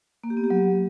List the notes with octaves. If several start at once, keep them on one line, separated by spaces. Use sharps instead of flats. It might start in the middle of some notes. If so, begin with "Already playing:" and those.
A#3
G4
B3
G4
F#3